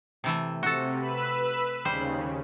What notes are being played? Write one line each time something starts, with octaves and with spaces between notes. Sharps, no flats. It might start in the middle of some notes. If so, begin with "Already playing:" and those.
C3 E3 A3
C3 F#4 A4
B4 B5 E6
D#2 C#3 G3 C5